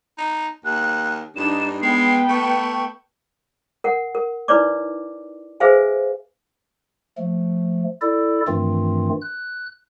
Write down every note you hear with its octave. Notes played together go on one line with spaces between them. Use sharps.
D#4
D#2 F#6
G2 D4 D#4 E7
G#3 B3 B4 G5 C7
A3 C#6
A#4 F#5
A#4
D#4 E4 B4 C#5 D5 D6
G#4 B4 C5 E5 F5 G#5
F3 A3
E4 A4 D5
G2 D#3 E3 A3 C4 F4
F#6